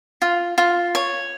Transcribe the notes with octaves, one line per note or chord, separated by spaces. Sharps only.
F4
F4
C#5